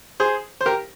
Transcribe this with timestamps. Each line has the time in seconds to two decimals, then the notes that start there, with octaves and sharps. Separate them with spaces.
0.20 G#4 C5
0.61 C5
0.66 G4 A#4